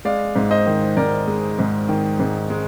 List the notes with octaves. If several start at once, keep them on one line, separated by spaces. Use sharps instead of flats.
G#3 D5 F5
G#2
C5 D#5
D#3
G#2 A#4 D5
G#3
G#2
D#3
G#2
G#3